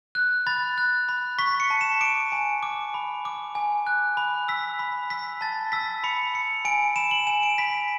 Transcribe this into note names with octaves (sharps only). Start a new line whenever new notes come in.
F#6
B5 A6
F#6
B5
C#6 B6
C#7
A5
E7
D6 D7
G#5
D6
B5
D6
G#5
F#6
B5
E6 B6
B5
E6 B6
A5 A6
E6 B6
B5 C#7
B5 C#7
G#5 D7
B5 E7
F#7
G#5 E7
D7
B5 B6